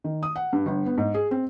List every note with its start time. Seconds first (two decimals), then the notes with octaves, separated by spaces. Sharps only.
0.04 D#3
0.23 D#6
0.36 F#5
0.53 G2
0.66 G1
0.86 B3
0.98 G#2
1.14 G#4
1.31 C4